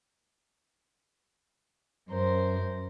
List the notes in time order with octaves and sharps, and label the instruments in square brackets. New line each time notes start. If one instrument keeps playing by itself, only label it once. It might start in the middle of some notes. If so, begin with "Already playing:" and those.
[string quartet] F#2 A#4 C5